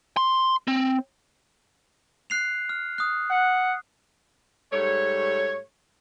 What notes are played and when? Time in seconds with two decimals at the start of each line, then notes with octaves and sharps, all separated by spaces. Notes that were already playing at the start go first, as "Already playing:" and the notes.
0.17 C6
0.68 C4
2.30 F#6 C7 F7
2.69 F6
2.98 D#6 F#6
3.30 F#5
4.72 G#2 G3 A3 C#5